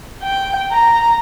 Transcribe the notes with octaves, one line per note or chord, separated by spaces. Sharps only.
G5
A#5